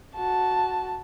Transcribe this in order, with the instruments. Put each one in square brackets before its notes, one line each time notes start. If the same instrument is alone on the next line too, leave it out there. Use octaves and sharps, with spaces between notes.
[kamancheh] F#4 A5